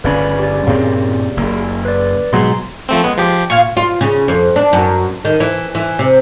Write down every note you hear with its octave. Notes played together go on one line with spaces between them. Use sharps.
G1 C#3 C#4 B4 D5 B5
G4 D5
G2 A#2 C#3 C4
F#1 A#3
B4 D5
G#2 B2 F#3 G#3 A#5 C6
F3 A3 C4
G#3 B3
F3 G4
A#2 F5 C#6 F6 G#6
F4
C#3
F2
D4
F#2
D#3
E3
E3
C3